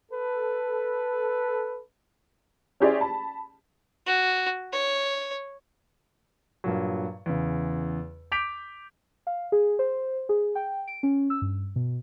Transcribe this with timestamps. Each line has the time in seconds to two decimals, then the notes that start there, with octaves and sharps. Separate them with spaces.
0.11 A4 B4
2.80 C#4 E4 G4 G#4 C5 D5
3.01 A5 B5
4.06 F#4
4.73 C#5
6.64 G2 A#2 F#3
7.26 E2 C#3
8.32 D6 G6 B6 D7 F7
9.27 F5
9.52 G#4
9.79 C5
10.29 G#4
10.55 G5
10.87 D7
11.03 C#4
11.30 E6
11.42 G2
11.76 B2